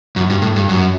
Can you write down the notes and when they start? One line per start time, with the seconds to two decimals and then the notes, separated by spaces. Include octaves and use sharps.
0.16 F#2
0.30 G2
0.42 A2
0.56 G2
0.69 F#2